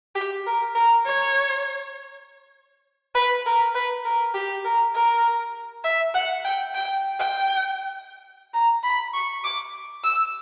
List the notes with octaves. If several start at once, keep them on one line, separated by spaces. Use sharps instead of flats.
G4
A#4
A#4
C#5
B4
A#4
B4
A#4
G4
A#4
A#4
E5
F#5
G5
G5
G5
A#5
B5
C#6
D6
E6